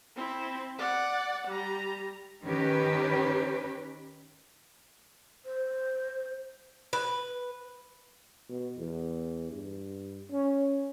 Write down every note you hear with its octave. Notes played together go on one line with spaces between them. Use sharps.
C4 E4
D5 F#5
G3 A#5
D#3 C#4 G4 B4
C5
B4
B2
E2
G2
C#4